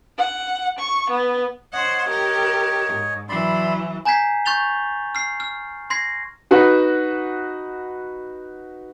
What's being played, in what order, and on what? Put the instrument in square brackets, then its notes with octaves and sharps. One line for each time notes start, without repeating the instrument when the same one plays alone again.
[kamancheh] F#5
C#6
B3
[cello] C5 F#5 [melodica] C#5 D#5
[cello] G4 A#4
G#2
[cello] E3 F#3 [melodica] D5 B5 C6
[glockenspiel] G#5 A#5 G6 G#6 B6 C7
C#6 G6 A6 F7 G7
F6 C7
F6
C6 G#6 A#6 C7
[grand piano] D#4 F#4 B4